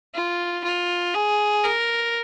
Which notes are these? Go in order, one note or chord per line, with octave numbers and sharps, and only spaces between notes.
F4
F4
G#4
A#4